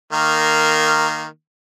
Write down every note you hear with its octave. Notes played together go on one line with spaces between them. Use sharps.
D#3 A#3